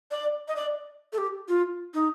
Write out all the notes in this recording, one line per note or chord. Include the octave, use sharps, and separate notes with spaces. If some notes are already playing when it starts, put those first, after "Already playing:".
D5
D#5
D5
A4
G4
F4
D#4